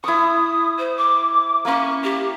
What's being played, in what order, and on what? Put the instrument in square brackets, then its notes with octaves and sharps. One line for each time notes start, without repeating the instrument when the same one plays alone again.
[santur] E4 C#6 [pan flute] D#6
[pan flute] C5
D6
[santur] A#3 C#6 [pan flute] C#4
[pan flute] G4